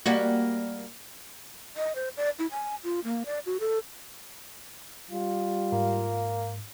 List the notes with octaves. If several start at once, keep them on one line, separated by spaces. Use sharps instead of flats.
G3 A#3 F#4
D#5
C5
D5
E4
G#5
F4
A#3
D5
F#4
A4
G3 F4
G#2 A#3